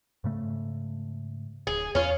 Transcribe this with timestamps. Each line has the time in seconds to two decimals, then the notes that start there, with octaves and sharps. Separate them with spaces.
0.24 G#2 C#3 A3
1.67 D1 G#4
1.95 E2 C#4 F4